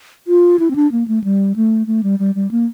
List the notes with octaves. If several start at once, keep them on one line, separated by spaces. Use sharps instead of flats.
F4
E4
C4
D4
A#3
A3
G3
A3
A3
G3
G3
G3
A#3